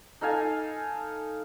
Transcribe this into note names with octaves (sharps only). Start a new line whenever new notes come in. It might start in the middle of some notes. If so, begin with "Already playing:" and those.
D#4 A4 F5 G#5